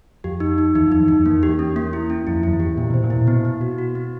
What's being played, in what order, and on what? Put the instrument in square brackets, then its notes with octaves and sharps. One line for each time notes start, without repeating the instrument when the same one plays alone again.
[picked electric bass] F2 [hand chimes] G4
[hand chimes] D#4
D#4
[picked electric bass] E2 [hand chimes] D#4
[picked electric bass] F2 [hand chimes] D#4
[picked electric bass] E2
[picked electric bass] F2 [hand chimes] D#4
[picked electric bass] E2 [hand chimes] A#3
[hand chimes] G4
C#4
A#3
E4
C#4
[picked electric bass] F2 [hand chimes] E4
[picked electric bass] F2 [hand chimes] E4
[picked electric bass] E2
[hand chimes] G4
[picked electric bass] A#2 [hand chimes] E4
[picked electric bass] B2 [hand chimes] C5
[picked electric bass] A#2
[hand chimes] E4
[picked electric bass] B2 [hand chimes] B3
[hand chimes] B3
F#4
F#4
B3